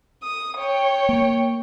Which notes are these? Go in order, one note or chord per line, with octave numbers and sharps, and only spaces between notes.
D#6
C#5 G5
A#3